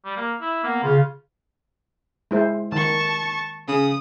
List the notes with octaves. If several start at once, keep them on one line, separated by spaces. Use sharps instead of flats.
G3
A#3
E4
A#3 B3
C#3 F4
G#3 E4 C5
D#3 A5 C#6
C#3 D#6